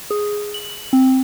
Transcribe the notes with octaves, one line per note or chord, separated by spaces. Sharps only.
G#4
F#7
C4